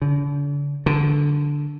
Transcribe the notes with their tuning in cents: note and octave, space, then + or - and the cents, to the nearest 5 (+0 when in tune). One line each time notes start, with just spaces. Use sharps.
D3 -40
D3 -5